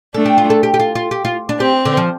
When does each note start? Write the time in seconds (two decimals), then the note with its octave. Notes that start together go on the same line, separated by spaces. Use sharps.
0.14 A3 D4 A4
0.25 G4
0.38 F4
0.50 A4
0.63 G4
0.74 G4
0.80 F4
0.95 F4
1.11 G4
1.25 F4
1.49 D4
1.60 C4 G4
1.85 D3
1.97 F3